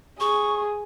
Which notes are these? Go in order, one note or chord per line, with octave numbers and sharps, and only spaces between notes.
G#4 C#6